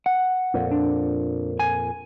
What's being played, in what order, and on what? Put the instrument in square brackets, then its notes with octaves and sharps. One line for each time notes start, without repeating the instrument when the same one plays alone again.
[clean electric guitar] F#5
[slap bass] F2 A#2
[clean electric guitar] D4
G#5